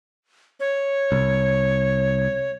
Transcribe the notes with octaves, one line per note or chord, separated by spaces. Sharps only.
C#5
C2